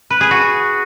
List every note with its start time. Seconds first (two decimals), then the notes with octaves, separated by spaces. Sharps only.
0.10 B4
0.21 G#4
0.31 F#4